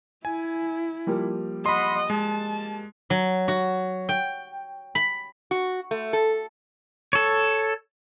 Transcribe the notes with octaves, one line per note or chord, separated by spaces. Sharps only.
E4 G#5
F3 G3 A#3
D#5 F#5 B5 C6
G#3 A5
F#3
F#4
G5
B5
F#4
A3
A4
A4 C#5